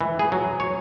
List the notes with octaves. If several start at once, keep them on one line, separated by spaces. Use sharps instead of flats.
E3
G#4
F#3
C#5